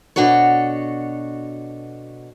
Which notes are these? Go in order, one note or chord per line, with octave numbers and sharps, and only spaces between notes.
B2 D4 F#4 A4 C#5